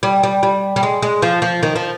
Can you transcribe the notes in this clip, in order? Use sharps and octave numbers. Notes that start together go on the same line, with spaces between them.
G3
G3
G3
G3
G#3
G#3
F3
F3
D#3
F3